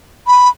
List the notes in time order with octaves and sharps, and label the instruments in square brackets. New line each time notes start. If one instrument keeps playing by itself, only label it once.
[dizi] B5